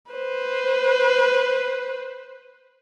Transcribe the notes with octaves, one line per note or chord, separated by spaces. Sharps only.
B4 C5